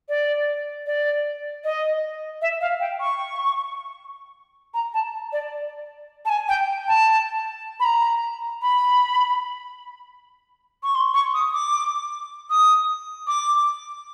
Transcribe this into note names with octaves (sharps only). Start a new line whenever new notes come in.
D5
D5
D#5
E5
F5
G5
C#6
A#5
A5
D5
A5
G#5
G5
A5
B5
A#5
B5
C#6
C6
C#6
D#6
D6
D#6
D6